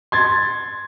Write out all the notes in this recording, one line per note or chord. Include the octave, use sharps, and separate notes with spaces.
C6 G#6 A6